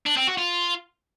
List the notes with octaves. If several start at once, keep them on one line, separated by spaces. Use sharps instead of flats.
D4
C4
F#4
F4